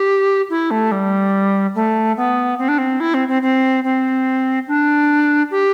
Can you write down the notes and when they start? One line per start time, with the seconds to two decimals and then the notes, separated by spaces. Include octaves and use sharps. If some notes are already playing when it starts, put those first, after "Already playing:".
Already playing: G4
0.50 E4
0.71 A3
0.92 G3
1.75 A3
2.17 B3
2.59 C4
2.68 D4
2.78 C4
3.00 E4
3.14 C4
3.28 C4
3.42 C4
3.84 C4
4.68 D4
5.51 G4